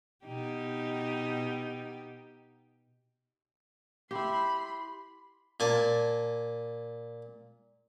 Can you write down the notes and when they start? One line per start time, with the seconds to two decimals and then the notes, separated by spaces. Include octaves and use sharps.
0.25 B2 D#4 G4
4.11 E4 G4 B5 C6
5.60 A#2 G#5 A5